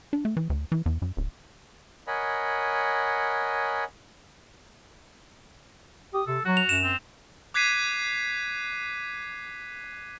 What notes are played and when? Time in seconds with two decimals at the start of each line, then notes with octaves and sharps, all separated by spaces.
0.13 D4
0.25 A3
0.37 E3
0.50 D2
0.72 E3
0.86 E2
1.02 F#2
1.17 D1
2.07 A#4 C#5 D#5 F#5 G#5 B5
6.14 G4 D#6
6.27 C3 A4
6.45 F#3 F#4
6.57 F7
6.69 F#2 E7
6.83 C4
7.54 D6 F#6 G#6 B6 C7 D#7